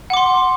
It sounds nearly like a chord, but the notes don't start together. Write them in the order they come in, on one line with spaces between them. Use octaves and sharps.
F#5 D6 C6